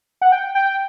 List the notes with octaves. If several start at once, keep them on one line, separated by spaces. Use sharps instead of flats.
F#5
G5
G5